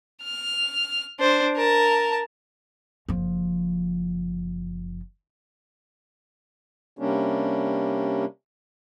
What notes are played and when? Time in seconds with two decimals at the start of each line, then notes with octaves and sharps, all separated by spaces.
0.23 F6
1.19 D4 C5
1.56 A#4 A5
3.09 F#1 F3
6.99 C3 G3 A#3 C#4 D4